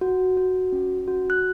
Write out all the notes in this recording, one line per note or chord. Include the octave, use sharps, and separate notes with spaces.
F#4
F#4
C#4
F#4
F#6